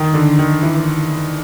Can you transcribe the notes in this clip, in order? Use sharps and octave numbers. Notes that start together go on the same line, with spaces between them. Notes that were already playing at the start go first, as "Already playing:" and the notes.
Already playing: D#3
D3
D#3
E3